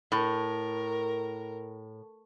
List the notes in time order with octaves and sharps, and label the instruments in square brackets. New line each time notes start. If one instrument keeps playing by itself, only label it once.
[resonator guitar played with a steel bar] A2 [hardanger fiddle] A#4